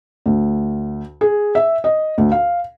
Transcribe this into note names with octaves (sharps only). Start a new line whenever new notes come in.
D2
G#4
E5
D#5
D2
F5